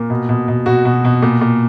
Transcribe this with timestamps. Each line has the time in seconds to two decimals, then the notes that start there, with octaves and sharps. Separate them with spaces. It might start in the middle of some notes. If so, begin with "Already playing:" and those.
Already playing: A#2 A#4
0.10 B2
0.29 B2
0.48 B2
0.66 B2 F#4
0.85 B2
1.05 B2
1.22 A#2
1.41 A#2